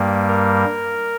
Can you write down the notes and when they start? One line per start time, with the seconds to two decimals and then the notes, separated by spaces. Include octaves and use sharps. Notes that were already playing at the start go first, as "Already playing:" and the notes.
Already playing: G2 G3 A#3
0.28 A#4